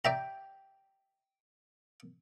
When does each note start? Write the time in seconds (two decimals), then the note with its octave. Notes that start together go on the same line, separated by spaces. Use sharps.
0.05 D5 E5 G5 A#5